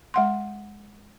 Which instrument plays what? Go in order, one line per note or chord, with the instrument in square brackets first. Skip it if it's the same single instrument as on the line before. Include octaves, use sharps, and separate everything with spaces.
[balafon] G#3 F#5 C6